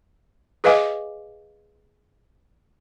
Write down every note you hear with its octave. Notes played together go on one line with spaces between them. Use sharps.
G#4 B4 D#5 F5 G#5 D6